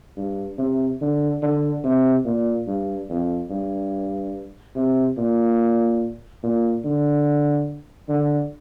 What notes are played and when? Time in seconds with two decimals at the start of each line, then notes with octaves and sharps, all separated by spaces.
0.17 G2
0.58 C3
1.01 D3
1.42 D3
1.84 C3
2.25 A#2
2.67 G2
3.09 F2
3.50 G2
4.76 C3
5.18 A#2
6.43 A#2
6.85 D3
8.09 D3